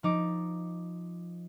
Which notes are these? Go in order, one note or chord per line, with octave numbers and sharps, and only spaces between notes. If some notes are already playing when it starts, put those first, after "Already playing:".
F3 D#4 D6